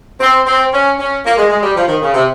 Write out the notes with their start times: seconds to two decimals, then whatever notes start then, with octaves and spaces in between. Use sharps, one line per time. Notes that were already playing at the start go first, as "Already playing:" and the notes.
0.21 C4
0.47 C4
0.72 C#4
0.99 C#4
1.25 A#3
1.37 G#3
1.50 G#3
1.63 G3
1.76 F3
1.88 D#3
2.02 C#3
2.14 C3